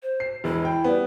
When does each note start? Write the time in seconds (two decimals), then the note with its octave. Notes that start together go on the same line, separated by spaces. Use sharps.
0.03 C5
0.20 C7
0.44 E1 E4
0.65 G5
0.84 G3 B3